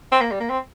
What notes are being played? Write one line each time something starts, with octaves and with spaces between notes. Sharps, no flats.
C4
A#3
G3
A#3
C4